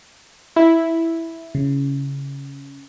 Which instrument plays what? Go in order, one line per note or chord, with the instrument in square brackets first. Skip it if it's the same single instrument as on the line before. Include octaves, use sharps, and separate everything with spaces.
[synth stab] E4
[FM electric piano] C#3